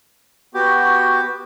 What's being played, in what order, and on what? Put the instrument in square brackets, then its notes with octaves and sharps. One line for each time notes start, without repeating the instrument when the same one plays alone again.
[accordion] B3 F#4 [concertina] G4